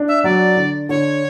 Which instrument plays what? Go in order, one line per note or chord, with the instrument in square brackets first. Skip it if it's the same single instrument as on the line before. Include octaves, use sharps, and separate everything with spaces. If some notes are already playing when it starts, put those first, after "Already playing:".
Already playing: [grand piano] D4
[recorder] E5
[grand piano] F#3 [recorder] D5
[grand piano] D3
[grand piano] D3 [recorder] C#5